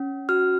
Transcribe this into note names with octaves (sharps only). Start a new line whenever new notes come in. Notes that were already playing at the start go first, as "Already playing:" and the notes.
Already playing: C#4
F#4 F6